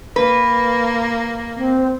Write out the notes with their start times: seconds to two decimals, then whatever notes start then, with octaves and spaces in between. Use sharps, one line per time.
0.16 A#3 B4
1.57 C4